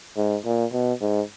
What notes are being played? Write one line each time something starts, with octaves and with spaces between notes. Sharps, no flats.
G#2
A#2
B2
G#2